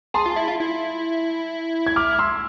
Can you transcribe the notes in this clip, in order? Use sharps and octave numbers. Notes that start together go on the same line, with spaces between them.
G#4 A5 C6
F4
E4
F4
E4
G#6
D6 F6
C6 E6